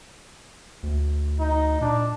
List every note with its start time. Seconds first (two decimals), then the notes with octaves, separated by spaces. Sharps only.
0.83 D2
1.40 D#4
1.81 A#2 D4